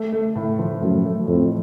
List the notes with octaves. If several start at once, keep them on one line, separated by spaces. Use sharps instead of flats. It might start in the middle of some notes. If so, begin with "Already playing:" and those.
Already playing: A3
A3
A2
F3
F#2 A2
A3
F2 A2